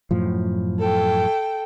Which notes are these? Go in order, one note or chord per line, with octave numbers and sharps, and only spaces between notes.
F#2 A2 F3
A4 G5